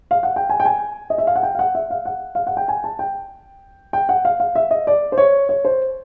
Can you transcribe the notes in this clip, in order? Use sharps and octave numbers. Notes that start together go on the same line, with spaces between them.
F5
F#5
G5
G#5
G5
G#5
D#5
E5
F5
F#5
G5
F5
F#5
E5
F5
F#5
F5
F#5
G5
G#5
A5
G5
G5
F#5
F5
F5
E5
D#5
D5
C5
C#5
C#5
C5